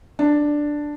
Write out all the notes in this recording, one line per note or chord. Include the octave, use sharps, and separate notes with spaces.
D4